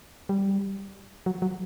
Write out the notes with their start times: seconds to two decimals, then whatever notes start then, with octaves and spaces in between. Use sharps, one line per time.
0.29 G3
1.26 F#3
1.42 F#3